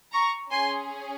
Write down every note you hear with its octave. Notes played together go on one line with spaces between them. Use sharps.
A#5 C#6
C#4 G#4 G#5 C6